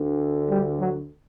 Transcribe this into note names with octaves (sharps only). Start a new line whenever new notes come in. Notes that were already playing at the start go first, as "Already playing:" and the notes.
Already playing: D2 D3
G3
F#3